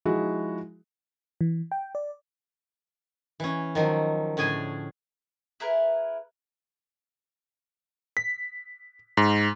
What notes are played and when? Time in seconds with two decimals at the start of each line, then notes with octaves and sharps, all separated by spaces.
0.05 F3 G#3 D#4 E4 F#4 G#4
1.41 E3
1.72 G5
1.95 D5
3.40 E3 C#4
3.75 D#3 F3 F#3
4.37 A2 D3 C#4 G#4 G#5
5.60 E4 G#4 A#4 B4
8.17 B6
9.17 G#2